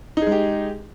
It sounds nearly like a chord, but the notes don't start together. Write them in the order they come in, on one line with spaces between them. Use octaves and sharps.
D#4 G#4 G#3 G4